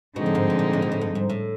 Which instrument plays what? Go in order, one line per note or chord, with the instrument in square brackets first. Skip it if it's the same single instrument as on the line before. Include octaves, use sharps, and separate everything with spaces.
[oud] B2 [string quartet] D3 F3 G#3 C4 D#4
[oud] A2
G#2
B2
A#2
A2
A#2
A2
G2
G#2
A2